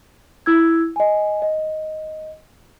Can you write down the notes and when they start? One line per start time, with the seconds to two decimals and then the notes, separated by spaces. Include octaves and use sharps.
0.46 E4 E6 G#6
0.96 D#5 G#5
1.42 D#5